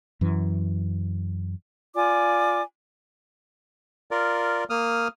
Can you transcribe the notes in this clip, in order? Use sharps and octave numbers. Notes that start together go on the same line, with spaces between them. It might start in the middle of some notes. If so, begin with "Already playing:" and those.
F#2 E3
F4 D5 G#5 D6
F4 A#4 D5
A#3 D#6 F6